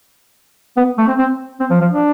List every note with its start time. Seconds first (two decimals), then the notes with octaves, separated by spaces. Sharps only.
0.77 B3
0.98 A3
1.08 C4
1.19 C4
1.60 C4
1.71 F3
1.81 F3
1.91 D4